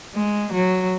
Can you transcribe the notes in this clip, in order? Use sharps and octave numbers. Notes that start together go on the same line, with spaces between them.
G#3
F#3